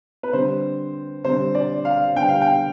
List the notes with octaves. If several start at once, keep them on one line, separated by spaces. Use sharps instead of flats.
B4
D3 G3 C4 C5
D3 G3 C4 C5
D5
F5
D3 G3 B3 G5
F5
G5